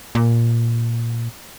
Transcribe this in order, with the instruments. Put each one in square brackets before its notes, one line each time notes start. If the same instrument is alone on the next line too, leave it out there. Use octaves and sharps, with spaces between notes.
[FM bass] A#2